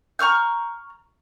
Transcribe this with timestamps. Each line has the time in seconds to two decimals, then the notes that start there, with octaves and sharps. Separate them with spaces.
0.19 A#5 C#6 F6 G6